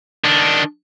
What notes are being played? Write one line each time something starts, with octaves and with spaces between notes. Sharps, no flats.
D#3 D4